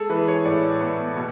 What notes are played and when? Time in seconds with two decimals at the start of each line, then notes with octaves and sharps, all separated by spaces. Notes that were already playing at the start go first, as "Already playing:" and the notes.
Already playing: G#3 G#4 A4
0.09 E3 B4
0.28 C#5
0.45 A2 D5
0.81 B3
1.16 B2